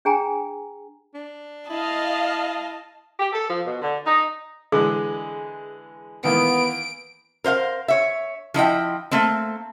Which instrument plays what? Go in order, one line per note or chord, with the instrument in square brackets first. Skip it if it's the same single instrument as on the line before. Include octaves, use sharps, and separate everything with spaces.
[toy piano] D4 G#4 G5 G#5 A#5
[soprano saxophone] D4
[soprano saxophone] E4 [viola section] D#5 F5 [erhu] A5
[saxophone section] G4
A4
F3
B2
D3
D#4
[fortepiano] D3 E3 G#3 [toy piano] G#4
[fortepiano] D#3 E3 A#3 [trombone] B3 [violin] D7
[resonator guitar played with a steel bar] A#4 C5 E5 F5
C#5 E5
F3 E4 D#5 G5
A3 A#3 C4